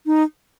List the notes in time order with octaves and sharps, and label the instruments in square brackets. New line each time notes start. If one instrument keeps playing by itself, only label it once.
[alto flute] D#4